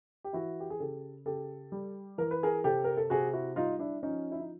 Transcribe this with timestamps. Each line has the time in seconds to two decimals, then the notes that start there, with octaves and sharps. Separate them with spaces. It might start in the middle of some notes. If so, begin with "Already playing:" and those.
0.24 G4
0.33 E3 E4 F#4
0.60 G4
0.70 G#4
0.80 C#3 G4 A4
1.26 C#3 G4 A4
1.72 G3
2.18 E3 A#4
2.31 B4
2.43 G#4 A#4
2.64 C3 G4 A4
2.84 A#4
2.97 A4
3.10 C3 F#4 G#4
3.33 E4 F#4
3.56 G3 D#4 F4
3.79 D4 E4
4.02 F3 C#4 D#4
4.32 E4
4.40 D#4